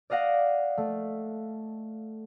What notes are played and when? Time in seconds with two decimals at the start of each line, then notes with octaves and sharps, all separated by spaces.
0.10 D5 D#5 F5 F#5 A#6
0.78 A3